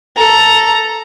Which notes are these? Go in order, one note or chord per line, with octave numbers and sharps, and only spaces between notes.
A4 A#5